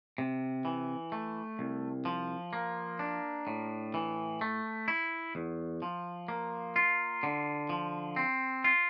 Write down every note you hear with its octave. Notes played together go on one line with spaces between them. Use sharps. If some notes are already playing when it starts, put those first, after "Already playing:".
C3
E3
A3
C2
F3
A#3
D4
A2
E3
A3
E4
E2
F3
A#3
F4
D3
F3
C4
F4